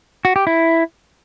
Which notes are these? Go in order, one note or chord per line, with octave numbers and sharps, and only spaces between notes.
F#4
G4
E4